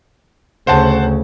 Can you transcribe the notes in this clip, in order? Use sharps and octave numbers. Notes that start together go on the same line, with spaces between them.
D2 C#3 C5 F#5 A5